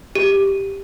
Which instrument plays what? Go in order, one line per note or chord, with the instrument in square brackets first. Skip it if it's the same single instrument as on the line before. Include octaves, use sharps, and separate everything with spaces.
[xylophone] G4